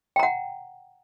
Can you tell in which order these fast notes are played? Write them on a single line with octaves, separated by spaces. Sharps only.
G5 A#5 F#5